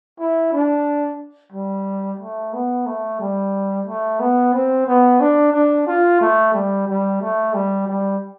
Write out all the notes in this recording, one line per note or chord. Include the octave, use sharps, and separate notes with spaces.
E4
D4
G3
A3
B3
A3
G3
A3
B3
C4
B3
D4
D4
F4
A3
G3
G3
A3
G3
G3